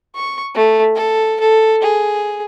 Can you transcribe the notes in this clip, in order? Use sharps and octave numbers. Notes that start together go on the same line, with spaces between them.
C#6
A3
A4
A4
G#4